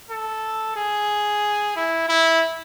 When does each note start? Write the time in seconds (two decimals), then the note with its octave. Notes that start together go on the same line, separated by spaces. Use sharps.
0.10 A4
0.76 G#4
1.76 E4
2.09 E4